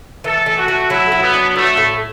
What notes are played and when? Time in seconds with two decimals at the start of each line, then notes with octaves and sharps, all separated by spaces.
0.24 E3 A4
0.46 A3
0.57 F#4
0.68 A3
0.90 F#3 E4
1.12 F#3
1.22 B3
1.34 D4
1.56 A3 F#4
1.77 A2